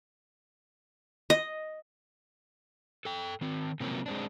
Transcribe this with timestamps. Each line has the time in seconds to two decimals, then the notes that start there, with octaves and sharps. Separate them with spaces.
1.30 D#5
3.05 A4 G5
3.41 D#3 C4
3.80 C3 F3 F#3 A#3 C4 C#4
4.06 G#3 C4 D4